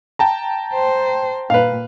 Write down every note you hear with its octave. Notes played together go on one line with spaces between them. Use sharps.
G5 A5 A#5
C5
A#2 B4 F5